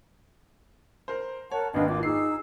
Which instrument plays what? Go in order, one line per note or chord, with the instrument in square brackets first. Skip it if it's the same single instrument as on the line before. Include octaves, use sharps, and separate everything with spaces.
[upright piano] A#4 C5
[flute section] A#4 F#5 A5 [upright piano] C#5
[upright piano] G#1 D#2 [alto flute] D4 [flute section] B4 D#5 F5
[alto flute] F4 [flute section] D6
[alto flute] D#4 [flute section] G#4 E6 [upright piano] C7